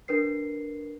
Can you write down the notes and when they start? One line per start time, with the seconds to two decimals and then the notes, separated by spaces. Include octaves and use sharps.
0.08 D4 A#4 B4 C7